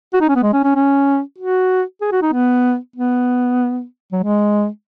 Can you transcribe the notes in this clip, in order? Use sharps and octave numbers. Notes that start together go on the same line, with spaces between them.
F#4
D#4
C#4
B3
G#3
C#4
C#4
C#4
F#4
G#4
F#4
D#4
B3
B3
F#3
G#3